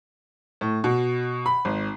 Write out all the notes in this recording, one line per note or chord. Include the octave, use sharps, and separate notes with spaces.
A2
B2
B5
G#1